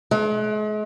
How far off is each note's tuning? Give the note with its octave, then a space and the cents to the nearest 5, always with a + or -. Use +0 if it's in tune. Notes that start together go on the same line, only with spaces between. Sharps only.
G#3 +40